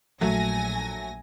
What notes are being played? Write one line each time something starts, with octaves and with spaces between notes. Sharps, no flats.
A#1 F#3 A3 G#5 A#6